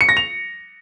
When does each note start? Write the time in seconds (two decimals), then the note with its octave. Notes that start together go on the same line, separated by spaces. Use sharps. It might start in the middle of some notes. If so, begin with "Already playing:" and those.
0.01 C#7
0.09 A#6
0.17 F7